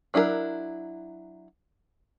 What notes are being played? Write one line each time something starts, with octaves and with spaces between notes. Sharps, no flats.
F#3 D4 E4 F#4 A#4